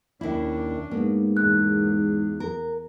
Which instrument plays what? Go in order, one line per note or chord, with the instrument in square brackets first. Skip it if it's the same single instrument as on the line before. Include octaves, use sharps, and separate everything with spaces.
[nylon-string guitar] D#2 E4 [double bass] C#4 D4
[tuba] G#2 [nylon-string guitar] A#3 B3
[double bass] E2 [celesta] F#6
[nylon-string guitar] A#4